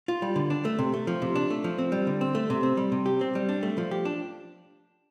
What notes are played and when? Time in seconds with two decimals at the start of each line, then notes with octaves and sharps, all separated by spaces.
0.08 F4
0.22 G3
0.36 D3
0.50 D4
0.65 A3
0.79 C3
0.94 A3
1.07 F3
1.22 C3
1.36 D4
1.50 A3
1.64 F3
1.78 C4
1.92 G3
2.07 D3
2.21 C4
2.35 A3
2.50 C3
2.63 C4
2.77 G3
2.92 C3
3.06 G4
3.21 C4
3.35 G3
3.49 D4
3.63 A3
3.78 F3
3.91 G4
4.05 D4